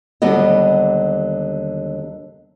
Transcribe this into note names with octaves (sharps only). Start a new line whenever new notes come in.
D#2 D3 F#3 G3 B3 D#5